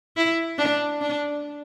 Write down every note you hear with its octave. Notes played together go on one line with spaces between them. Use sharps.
E4
D4
D4